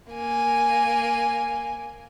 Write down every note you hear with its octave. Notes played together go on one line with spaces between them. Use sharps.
A#3 G#5